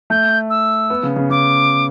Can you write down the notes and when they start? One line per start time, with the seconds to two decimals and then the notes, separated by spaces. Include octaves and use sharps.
0.10 A3 G6
0.50 E6
0.90 B3
1.03 C#3
1.16 C#3
1.30 C#3 D6